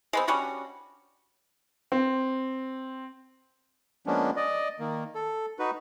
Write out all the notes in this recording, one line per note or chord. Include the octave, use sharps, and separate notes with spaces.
G#3 B3 C4
G3 C#4 D4 F#4
C4
F3 G#3 A#3 B3 C#4 D4
D5 D#5
D#3 A#3
A4
D#4 F#4 B4